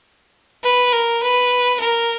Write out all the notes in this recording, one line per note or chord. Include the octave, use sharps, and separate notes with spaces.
B4
A#4
B4
A#4